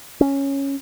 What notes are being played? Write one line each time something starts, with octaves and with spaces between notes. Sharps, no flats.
C#4